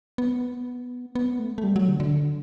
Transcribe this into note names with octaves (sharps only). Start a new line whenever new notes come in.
B3
B3
A3
A3
G3
F#3
D3
D3